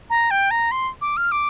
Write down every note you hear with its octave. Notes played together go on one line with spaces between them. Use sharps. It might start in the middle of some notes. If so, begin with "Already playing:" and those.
A#5
G5
A#5
C6
D6
F6
D6